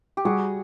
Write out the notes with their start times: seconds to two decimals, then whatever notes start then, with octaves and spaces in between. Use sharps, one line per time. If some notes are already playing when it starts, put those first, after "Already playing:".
0.17 G4
0.25 G3 F#4 G#4